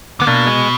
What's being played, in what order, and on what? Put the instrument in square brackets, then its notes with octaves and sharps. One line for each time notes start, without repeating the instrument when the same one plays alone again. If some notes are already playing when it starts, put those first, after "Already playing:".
[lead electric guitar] D3 [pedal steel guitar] B3
[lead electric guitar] B2 [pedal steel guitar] A#3 D4
[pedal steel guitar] G#3